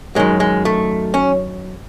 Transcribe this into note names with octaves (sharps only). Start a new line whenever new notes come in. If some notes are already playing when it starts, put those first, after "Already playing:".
F#2 D#3 F#3 G#3
G#3
A3
C#4